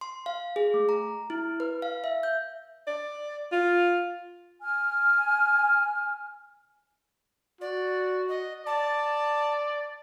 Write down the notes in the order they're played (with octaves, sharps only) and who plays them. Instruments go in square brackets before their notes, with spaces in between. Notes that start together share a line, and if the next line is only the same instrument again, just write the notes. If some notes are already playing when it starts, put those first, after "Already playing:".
[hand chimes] C6
F5
G#4
A3
A#5
E4
B4
F5
E5
G6
[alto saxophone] D5
F4
[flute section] G#5 F6
[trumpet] F#4 [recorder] D5
[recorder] D#5
[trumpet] D5 [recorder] A5